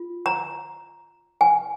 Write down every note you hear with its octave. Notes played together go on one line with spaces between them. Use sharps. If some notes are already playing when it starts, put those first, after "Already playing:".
Already playing: F4
A#5
G#5